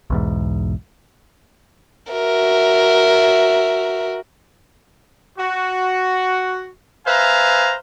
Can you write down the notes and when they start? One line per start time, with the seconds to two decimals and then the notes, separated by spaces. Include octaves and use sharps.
0.10 B1 E2 G#2
2.11 F#4 A#4 E5
5.38 F#4
7.06 B4 C5 E5 F5 G#5 A#5